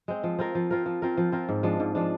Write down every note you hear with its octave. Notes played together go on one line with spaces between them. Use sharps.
G#3 C4
F3
C4 F4 A#4
F3
C4 F4 A#4
F3
C4 F4 A#4
F3
C4 F4 A#4
G#2
F3 G#3 D4
G#2
F3 G#3 D4